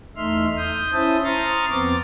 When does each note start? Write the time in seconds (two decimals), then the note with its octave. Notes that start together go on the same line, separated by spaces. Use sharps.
0.17 E2 A3 D#4 E5 C6 F6
0.57 D#6 G6
0.93 C#4 E4 C5 E5 A5 D#6
1.24 A#5 C6 C#6 D#6 F6 A6
1.69 F2 B3 C4 D6 A6